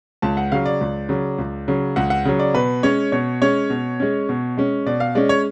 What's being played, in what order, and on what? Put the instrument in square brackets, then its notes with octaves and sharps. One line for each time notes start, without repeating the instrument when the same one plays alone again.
[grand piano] C#2 A5
F#5
C#3 F#3 F5
D5
C#2
C#3 F#3
C#2
C#3 F#3
C#2 F#5
F#5
C#3 F#3
D5
B2 B4
G#3 C#4 C#5
B2 C#5
G#3 C#4 C#5
B2
G#3 C#4
B2
G#3 C#4
B2 D5
F5
G#3 C#4 D5
C#5